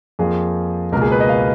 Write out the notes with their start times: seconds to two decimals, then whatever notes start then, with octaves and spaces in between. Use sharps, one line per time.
0.19 F2 F3 A#3 G#4
0.92 C#2 B2 A#3 A#4
1.02 G#4
1.12 B4
1.20 D#5
1.29 F5